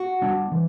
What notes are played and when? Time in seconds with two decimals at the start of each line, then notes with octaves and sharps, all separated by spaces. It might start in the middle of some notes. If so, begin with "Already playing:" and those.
Already playing: F#4
0.22 G3 B3 D4
0.51 E3